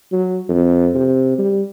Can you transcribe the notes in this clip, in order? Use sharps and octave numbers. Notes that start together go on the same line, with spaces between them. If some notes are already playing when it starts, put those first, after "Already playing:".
F#3
F2
C3
G3